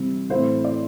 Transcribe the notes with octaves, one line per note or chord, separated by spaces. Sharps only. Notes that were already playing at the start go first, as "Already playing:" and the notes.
Already playing: C3 E3 G3 C4 E4
A2 E3 A3 C4 E4 C5
D5